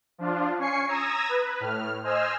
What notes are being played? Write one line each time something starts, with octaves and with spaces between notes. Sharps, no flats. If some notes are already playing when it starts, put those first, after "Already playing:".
F3 D4 F4
C#4 G#5 C#6 C7 C#7
A#5 D#6 E6 G#6 A#6
B4
A2 F6
C5 D#5 G#5 E6 F6